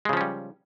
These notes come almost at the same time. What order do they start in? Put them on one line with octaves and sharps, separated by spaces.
G#3 C#3 F3 C#4 G3